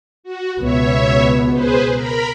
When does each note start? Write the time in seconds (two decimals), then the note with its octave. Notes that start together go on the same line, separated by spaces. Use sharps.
0.24 F#4
0.60 C#2 B2 B3 C#5 E5
1.52 G#4 B4 C5
1.94 A#4 A#5 B5